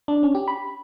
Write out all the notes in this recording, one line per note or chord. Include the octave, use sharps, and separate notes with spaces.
D4
C#4
G4
B5